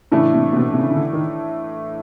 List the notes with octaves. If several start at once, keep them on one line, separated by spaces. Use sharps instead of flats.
A2 C#3 E3 A3 D4
C3
C3
B2
C3
C#3
C#3
D3
D#3